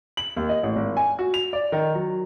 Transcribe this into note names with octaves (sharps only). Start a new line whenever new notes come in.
F#7
D#2
D#5
A1
G#1
G#5
F#4
F7
D5
D#3
F#3